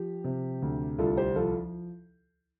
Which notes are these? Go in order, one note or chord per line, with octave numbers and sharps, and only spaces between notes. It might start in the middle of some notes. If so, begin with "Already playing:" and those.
Already playing: F3 G4
C3
D2
C2 F4 A4
G4 C5
F3 F4 A4